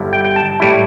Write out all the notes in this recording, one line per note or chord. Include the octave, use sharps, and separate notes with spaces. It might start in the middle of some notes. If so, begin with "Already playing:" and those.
Already playing: G1 G2 D3 G3 E4
G5
G5
A5
A2 G3 E4